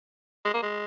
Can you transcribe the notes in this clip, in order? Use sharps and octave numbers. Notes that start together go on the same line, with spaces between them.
G#3
A#3
G#3